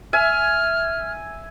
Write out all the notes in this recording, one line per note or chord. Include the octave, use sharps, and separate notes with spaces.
E5 G#5 F6